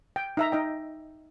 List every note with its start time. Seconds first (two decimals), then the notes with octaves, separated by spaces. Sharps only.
0.16 G5
0.37 D#4 E5 A#5
0.52 D#4 D#5 G5